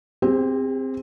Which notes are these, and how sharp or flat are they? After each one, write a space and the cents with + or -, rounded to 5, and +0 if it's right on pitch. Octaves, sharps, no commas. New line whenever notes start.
C4 +0 G#4 -45